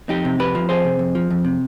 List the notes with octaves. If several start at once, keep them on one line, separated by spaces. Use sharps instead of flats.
F2 D#4 G4
C3
F2 G4 B4
F3
F2 G#4 C5
C3
F2
F3
F2
C3